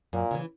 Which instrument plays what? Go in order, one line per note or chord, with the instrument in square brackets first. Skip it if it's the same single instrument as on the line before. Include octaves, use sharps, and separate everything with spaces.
[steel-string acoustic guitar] F#2 [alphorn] A#2
[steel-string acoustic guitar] C#3 E3